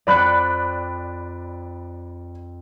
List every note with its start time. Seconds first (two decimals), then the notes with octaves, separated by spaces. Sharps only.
0.07 F2 D5 F5 B5 C#6 F#6